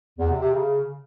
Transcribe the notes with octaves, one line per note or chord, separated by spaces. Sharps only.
E2
C3
C3
C#3